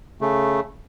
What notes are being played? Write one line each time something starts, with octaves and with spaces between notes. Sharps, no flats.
C#3 A3